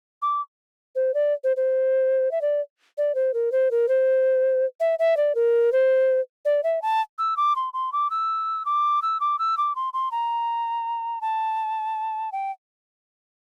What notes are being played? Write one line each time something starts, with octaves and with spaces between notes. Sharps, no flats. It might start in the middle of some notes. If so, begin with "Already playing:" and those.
D6
C5
D5
C5
C5
E5
D5
D5
C5
A#4
C5
A#4
C5
E5
E5
D5
A#4
C5
D5
E5
A5
E6
D6
C6
C6
D6
E6
D6
E6
D6
E6
D6
C6
C6
A#5
A5
G5